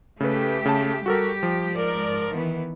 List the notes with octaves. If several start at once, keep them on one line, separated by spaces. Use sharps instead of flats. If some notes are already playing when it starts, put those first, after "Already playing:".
C#3 A3 G4 A4 B4
C#3 A5
G3 F#4 G4 A4 A#4
F3
G#2 A#4 D5
D#3 E3 B3